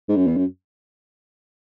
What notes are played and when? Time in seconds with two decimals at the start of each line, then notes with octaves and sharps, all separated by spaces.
0.09 G#2
0.16 F#2
0.27 E2
0.37 F#2